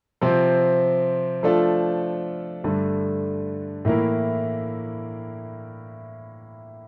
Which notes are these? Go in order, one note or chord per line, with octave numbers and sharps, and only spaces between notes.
C3 F3 C4
F3 A3 D4 F4 A4
G2 D3 A3
A2 E3 A#3 E4 A#4